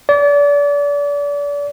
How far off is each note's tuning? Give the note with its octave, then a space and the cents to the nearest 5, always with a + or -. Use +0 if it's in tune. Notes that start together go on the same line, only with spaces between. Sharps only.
D5 -35